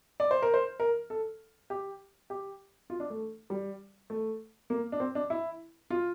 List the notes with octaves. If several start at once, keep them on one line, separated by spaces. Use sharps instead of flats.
D5
C5
A#4
C5
A#4
A4
G4
G4
F4
D4
A3
G3
A3
A#3
D4
C4
D4
E4
F4